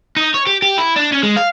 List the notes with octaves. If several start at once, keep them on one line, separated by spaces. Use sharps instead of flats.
D#4
C#5
G4
G4
E4
D4
C#4
G#3
F5